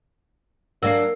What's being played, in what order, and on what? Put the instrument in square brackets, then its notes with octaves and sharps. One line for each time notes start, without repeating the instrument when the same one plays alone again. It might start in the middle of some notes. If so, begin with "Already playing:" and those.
[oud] F#3 A#3 [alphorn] D4 [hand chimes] A#4 [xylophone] E6 C7